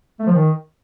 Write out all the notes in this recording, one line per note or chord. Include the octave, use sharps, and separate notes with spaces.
A3
F3
D#3